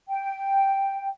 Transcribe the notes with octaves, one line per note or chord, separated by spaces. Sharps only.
G5